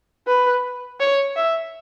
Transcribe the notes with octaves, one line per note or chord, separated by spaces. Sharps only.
B4
C#5
E5